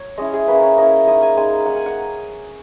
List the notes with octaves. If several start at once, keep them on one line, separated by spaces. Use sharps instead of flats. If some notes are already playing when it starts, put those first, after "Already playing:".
Already playing: C#5
G#3 C#4 E4 D#5
G#4
A#3 C#4 E4 B4
C#5
A#3 C#4 E4 D#5
G#3 D#4 D#5
G#5
G#3 D#4 G#5
A#3 D#4 F#5
G#5
F#5